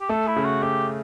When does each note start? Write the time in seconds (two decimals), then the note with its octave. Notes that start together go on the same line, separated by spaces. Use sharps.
0.01 G4
0.09 A3 A4
0.27 E4
0.36 C#3
0.45 F#4
0.63 A3 G4